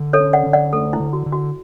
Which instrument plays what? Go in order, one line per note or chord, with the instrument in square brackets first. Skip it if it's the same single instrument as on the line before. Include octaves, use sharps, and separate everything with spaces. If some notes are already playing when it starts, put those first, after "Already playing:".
Already playing: [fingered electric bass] D3
[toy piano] A4 C#5
[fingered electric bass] C#4
[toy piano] D5 F#5
[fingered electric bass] D3
[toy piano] D5 F#5
[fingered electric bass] A3 [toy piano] A4
[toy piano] E4
[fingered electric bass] D3
[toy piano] F#4
[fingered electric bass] D3
[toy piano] F#4